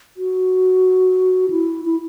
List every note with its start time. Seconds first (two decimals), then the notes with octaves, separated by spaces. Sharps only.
0.17 F#4
1.50 E4
1.85 E4